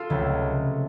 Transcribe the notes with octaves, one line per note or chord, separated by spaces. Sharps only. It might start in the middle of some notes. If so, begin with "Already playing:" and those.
Already playing: F4 A4
C#2 C3 F#3 A3